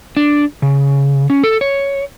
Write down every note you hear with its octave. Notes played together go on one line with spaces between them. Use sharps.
D4
C#3
C#4
A4
C#5